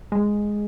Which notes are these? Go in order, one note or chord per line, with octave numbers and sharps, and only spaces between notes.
G#3